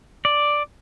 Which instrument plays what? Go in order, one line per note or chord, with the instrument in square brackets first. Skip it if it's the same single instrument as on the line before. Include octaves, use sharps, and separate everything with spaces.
[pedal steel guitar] D5